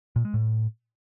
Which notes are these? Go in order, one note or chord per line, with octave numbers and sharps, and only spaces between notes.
A#2
G#3
A2